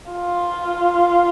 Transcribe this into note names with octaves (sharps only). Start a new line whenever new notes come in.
F4